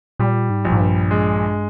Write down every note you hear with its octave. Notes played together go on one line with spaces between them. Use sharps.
A#2 G3
G#2
A#1
G#2
G2
G#3